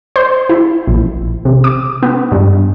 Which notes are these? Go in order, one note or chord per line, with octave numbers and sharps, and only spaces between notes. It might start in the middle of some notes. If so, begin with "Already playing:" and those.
C5
E4
A#1
C3
D6
B3
G2